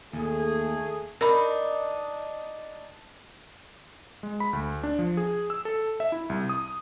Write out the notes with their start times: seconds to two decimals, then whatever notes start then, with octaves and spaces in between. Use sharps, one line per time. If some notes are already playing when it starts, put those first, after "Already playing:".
0.13 D#2 A3 G#4
1.21 D4 D#4 A#4 B5
4.23 G#3
4.40 B5
4.53 D2
4.83 D4
4.99 F3
5.17 G#4
5.50 E6
5.65 A4
6.00 E5
6.12 E4
6.30 C2
6.49 D#6